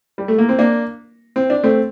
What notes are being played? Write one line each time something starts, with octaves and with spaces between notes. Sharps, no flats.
G3
A3
A#3
C4
A#3 D4
C4
D4
A3 C4